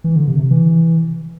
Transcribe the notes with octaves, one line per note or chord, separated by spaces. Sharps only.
E3
D3
C3
C3
E3